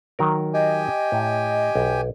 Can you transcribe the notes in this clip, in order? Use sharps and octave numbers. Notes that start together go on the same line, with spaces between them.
D#3 F#3 A#4
G4 D#5 G5 G#5
A2
B1